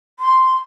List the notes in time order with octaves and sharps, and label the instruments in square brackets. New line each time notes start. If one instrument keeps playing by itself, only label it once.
[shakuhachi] C6